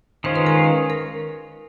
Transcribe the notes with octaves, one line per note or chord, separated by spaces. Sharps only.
D#3 G#3 C#4 F4 C5
B4
A#4
A#4